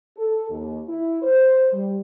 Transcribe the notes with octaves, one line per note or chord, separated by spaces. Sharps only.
A4
D#2
E4
C5
G3